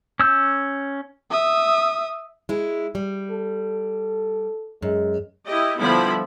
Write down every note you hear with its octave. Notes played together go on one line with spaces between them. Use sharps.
C#4 E6 G6
E5 D#6
G#3 E4
G3
A4
F#2 G#3
E4 G4 D#5
D3 F3 G3 B3 E4 B5